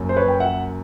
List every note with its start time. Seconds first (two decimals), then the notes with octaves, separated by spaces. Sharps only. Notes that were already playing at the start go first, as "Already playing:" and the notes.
Already playing: F#1 F#2
0.09 C5
0.16 B4 C#5
0.28 G5
0.40 E5 F#5